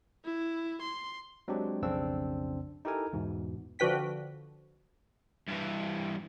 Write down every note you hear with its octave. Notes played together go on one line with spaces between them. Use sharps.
E4
C6
F#3 G#3 C4 D4 G4
B1 F2 C#3 C4 D4 E6
D#4 E4 G4 A4 A#4 G#5
E2 G#2 B2
D3 F3 F#4 B4 G5 B6
G2 E3